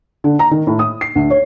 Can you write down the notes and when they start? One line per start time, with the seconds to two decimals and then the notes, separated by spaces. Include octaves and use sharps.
0.24 D3
0.39 A#5
0.51 D#3
0.67 A2
0.79 D#6
1.01 C7
1.15 D2
1.30 C#5